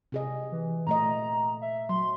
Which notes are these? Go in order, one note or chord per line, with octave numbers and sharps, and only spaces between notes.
C3 G#4 D#5
E3
A#2 A3 D#5 A#5
E5
F#3 C6